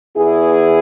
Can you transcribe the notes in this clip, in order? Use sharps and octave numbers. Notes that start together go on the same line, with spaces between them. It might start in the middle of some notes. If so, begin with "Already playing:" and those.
E2 E3 B3 E4 G#4